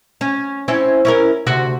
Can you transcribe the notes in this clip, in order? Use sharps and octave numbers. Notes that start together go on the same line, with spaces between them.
C#4
C4 C#4 E4
C#4 E4 A#4
D2 C3 F#4